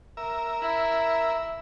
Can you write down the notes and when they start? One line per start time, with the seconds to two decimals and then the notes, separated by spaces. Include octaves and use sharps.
0.17 A#4 E5
0.62 E4